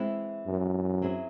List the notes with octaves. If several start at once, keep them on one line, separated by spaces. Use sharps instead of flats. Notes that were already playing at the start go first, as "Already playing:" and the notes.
Already playing: E3 G#3 C4 E4
F#2
F#3 C4 E4 G#4